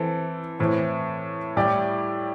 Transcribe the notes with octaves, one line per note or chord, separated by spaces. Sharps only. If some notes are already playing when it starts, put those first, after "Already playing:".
Already playing: E3 C4 A4
A2 E3 C4
A2 G3 E4 G4 D5